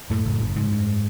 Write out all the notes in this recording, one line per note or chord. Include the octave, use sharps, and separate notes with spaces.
F#2 A2 A3
F#1
F#1
G#2 C#3 G#3
F#2